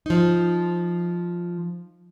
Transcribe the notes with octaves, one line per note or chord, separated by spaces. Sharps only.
F3 D#4